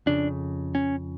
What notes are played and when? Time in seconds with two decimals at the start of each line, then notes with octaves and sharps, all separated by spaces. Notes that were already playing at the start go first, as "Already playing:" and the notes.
0.06 F2 C#3 D4
0.75 C#4